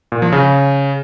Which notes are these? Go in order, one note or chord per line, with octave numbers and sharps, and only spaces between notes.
A#2
F3
C#3